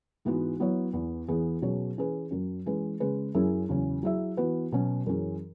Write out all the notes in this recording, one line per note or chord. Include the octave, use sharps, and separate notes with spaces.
G#2 E3 G#3 B3 F#4
F#3 B3 E4 C#5
E2 E3 B3
E2 E3 B3 G#4
B2 F#3 C#4 G#4 C#5
E3 C#4 G#4 B4
F#2 F#3 C#4
E3 G#3 C#4 G#4 B4
C#3 G#3 C#4 G#4 B4
F#2 F#3 C#4 E4 G#4
E2 C#3 F#3 C#4
F#3 E4 G#4 E5
E3 B3 F#4 B4
B2 F#3 C#4 F#4
F#2 E3 C#4 G#4